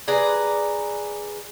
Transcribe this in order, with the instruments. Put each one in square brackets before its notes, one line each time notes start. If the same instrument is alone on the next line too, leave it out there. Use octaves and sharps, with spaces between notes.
[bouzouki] G#4 B4 D5 A#5